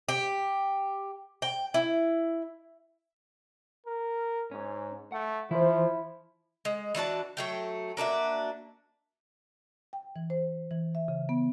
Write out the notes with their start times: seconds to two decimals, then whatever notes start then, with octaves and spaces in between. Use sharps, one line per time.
0.09 G4
1.42 G5
1.74 E4
3.86 A#4
4.51 G#2 C#4
5.12 A3 F#5
5.51 E3 F3 E4 C5 E5
6.65 G#3
6.95 E3 D4 F#4 A5
7.37 F#3 A3 G5
7.97 A#3 D4 F#4 E5
9.93 G5
10.16 E3
10.30 C5
10.71 E3
10.95 E5
11.08 C#3
11.29 B3